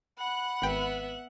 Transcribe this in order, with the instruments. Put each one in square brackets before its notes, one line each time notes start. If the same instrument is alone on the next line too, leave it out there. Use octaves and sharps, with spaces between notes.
[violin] F#5 F#6 [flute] B5
[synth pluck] G#1 G5 [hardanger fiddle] B3 E5